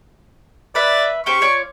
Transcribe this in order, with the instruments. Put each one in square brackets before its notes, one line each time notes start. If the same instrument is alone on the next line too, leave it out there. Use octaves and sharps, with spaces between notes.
[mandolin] B4 E5 [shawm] D5
[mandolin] C#4 G4 C5 [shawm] C#6
[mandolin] F4 C#5 D5